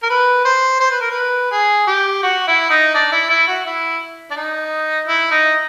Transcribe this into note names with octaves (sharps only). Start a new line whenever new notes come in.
A#4
B4
C5
C5
B4
A#4
B4
G#4
G4
F#4
E4
D#4
D4
E4
E4
F#4
E4
D4
D#4
E4
D#4